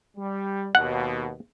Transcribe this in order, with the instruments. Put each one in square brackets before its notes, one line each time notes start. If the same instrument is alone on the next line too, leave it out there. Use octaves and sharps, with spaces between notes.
[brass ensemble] G3
[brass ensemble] D#2 B2 [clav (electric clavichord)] F#5